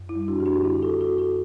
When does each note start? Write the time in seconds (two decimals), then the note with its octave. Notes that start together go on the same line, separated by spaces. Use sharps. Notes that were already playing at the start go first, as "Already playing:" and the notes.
Already playing: F#2
0.09 E4
0.16 G3
0.28 D4 F#4
0.40 F#2 G4
0.46 D4 F#4
0.63 D3 E4 G4
0.83 F#4 A4
0.88 D3
1.01 F#4 A4
1.13 F#2
1.18 F#4 A4